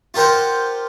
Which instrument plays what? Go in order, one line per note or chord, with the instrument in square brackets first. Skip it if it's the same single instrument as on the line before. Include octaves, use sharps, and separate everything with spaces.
[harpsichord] F4 G4 A#4 C5 F#5